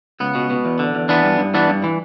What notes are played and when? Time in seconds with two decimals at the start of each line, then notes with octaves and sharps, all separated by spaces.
0.20 C#2 B3
0.35 B2
0.50 B2
0.65 E2
0.79 D3
0.95 E2
1.09 E3 B3 D4
1.24 G2
1.39 G2
1.54 E3 B3 D4
1.69 G2
1.84 E3